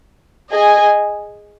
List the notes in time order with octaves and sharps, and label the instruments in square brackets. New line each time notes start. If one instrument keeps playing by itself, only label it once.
[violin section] G#4 D#5 G#5